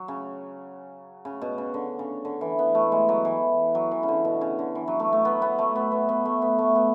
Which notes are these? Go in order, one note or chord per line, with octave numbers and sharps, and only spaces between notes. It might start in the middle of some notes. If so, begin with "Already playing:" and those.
Already playing: F#3
C#3
C#3
B2
C#3
D3
C#3
D3
E3
B3
A3
G#3
F#3
E3
F#3
E3
C#3
D3
B2
C#3
D3
E3
F#3
A3
A3
B3
B3
A3
B3
B3
B3
A3
B3
A3
B3